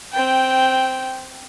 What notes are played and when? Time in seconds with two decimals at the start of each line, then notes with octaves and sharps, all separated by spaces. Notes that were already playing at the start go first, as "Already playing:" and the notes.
0.12 C4 G5